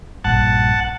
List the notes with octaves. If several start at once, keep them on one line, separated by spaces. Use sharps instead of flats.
A#1 G2 F#5 A5